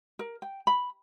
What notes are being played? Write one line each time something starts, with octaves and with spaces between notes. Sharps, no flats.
A#4
G5
B5